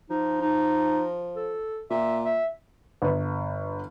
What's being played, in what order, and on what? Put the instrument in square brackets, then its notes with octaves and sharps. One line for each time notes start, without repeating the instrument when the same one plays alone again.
[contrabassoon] F3 [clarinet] D#4
[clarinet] D#4
A4
[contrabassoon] A#2 [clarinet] E5
[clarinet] E5
[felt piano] G1 B4